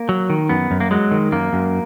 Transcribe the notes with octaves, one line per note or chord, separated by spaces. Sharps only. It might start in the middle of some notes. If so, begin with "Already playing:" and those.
Already playing: A#3
F#3
D#3
F#2 B3
F#2
A#3
F#3 G#3
D#3
F#2 A#3
F#2